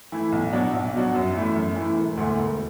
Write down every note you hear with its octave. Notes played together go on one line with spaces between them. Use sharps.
E3 A3 E4
B1
B2 F#3 D4 F#4
B1
B2 F#3 D4 F#4
F#2
E3 A3 E4
F#2
E3 A3 E4
E1
D2 D3 A3
E1